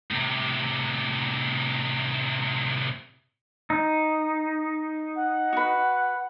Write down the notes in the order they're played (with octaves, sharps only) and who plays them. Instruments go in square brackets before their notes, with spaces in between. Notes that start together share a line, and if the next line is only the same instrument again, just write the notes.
[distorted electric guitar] A2 C3
[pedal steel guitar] D#4
[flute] F#5
[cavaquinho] F#4 B4